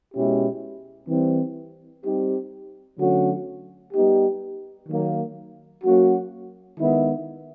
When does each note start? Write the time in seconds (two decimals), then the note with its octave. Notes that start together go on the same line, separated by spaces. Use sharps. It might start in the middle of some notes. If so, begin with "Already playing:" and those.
0.15 B2 G#3 C#4 E4 G4
1.09 E3 G3 C4
2.05 G3 C4 D#4 G4
2.99 D3 F#3 A3 C#4 F#4
3.94 G3 B3 D#4 G4
4.89 D#3 F#3 A#3
5.84 F#3 A#3 C#4 F#4
6.79 D#3 G#3 B3 E4